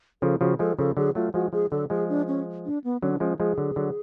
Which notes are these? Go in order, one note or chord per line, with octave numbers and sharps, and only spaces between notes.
C#3 F3 A4
C#3 F3 F#4
F3 G#3 A4
C#3 F3 A4
D3 F#3 G#4
F#3 A3 F4
F3 G#3 F#4
F3 G#3 G#4
D3 F#3 A4
F3 G#3 G#4
D4
C#4
D4
B3
D3 F#3 C#4
D4
F3 G#3 C#4
F3 G#3 G#4
D3 F#3
D3 F#3